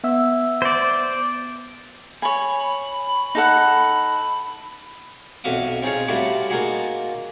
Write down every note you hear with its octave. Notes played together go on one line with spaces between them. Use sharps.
B3 E5 E6
C5 D5
C#5 G#5 B5
D#4 A4 F#5
B1 F2 F#4 E5 F5 D#6
C4 C#4 D#4 F4 G#4 C#5
A2 G3 A3 F4 F#4
A#3 D#4 F4 F#4 G#4